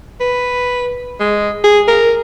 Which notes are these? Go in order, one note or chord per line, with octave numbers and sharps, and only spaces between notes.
B4
G#3
G#4
A#4